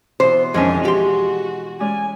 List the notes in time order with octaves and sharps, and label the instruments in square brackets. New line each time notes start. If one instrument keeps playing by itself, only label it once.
[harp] B2 E3 [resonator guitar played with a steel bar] C5
[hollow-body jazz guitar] F2 D#3 D4 [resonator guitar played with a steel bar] G#3 [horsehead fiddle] C#4 D#5
[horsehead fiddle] F#4 [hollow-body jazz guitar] G4 C6
[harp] G#3 C#4 D5 [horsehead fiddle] G#5